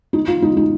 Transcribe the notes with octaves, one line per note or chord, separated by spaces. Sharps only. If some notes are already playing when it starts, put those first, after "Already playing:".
D#4
F4
D#4
D#4